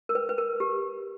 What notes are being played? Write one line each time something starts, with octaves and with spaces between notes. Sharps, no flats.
A#4
B4
B4
A#4
G4